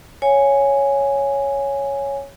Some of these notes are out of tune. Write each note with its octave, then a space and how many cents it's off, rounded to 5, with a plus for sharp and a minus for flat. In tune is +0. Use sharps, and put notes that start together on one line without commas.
C#5 +0 F5 +5 G#5 +0